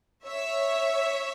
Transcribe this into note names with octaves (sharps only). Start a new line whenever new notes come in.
C#5 E5